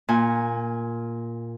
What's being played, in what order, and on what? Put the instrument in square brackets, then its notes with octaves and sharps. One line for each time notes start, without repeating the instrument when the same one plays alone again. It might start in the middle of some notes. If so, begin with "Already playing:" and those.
[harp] A#2 G#5